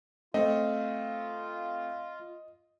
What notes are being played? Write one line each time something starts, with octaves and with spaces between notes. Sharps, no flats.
A3 C4 F4 D#5